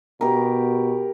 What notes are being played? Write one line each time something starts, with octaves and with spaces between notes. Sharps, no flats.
B2 G4 A#4